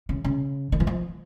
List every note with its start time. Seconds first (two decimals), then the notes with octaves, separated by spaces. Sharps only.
0.09 C#3
0.24 C#3
0.72 D#3
0.80 E3
0.87 F3